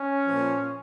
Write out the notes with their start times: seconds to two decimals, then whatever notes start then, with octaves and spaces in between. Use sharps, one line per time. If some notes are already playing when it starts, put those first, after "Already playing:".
Already playing: C#4
0.27 A#2 F3